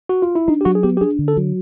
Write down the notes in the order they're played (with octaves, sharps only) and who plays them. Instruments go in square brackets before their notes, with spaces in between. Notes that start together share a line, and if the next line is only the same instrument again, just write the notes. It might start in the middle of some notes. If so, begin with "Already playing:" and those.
[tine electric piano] F#4
F4
E4
[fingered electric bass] D4 [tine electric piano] D#4
[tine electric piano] G4
[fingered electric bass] F#3 [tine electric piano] F#4
[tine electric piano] G#4
[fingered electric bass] B3 [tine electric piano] G4
[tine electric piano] G4
[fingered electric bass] D4 [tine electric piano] G#4
[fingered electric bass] D3
[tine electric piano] A4
[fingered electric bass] F#3